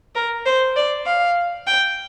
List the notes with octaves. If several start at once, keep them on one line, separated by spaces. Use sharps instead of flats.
A#4
C5
D5
F5
G5